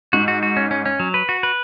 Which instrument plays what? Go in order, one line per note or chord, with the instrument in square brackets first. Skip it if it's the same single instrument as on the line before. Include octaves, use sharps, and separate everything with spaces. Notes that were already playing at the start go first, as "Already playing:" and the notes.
[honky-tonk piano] G#2 [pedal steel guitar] F#4
[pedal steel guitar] F#4
F#4
C#4
C#4
C#4
F#3
B4
F#4
B4